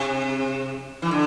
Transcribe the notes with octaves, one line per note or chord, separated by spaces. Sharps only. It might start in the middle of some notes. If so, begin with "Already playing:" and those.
Already playing: C3
E3
D3